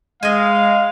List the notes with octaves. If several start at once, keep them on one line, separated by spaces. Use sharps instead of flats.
G#3 D#5 F5 G#5